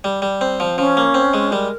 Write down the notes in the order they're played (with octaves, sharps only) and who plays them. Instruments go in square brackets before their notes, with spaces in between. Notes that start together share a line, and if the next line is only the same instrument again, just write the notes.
[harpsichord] G3
G3
C4
F3
[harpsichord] F3 [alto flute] C#4
[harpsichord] A#3
C4
G#3
[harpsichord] G3 [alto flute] A#4